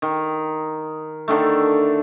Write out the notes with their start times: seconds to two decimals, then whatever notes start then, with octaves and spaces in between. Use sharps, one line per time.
0.02 D#3
1.28 D3 D#3 A3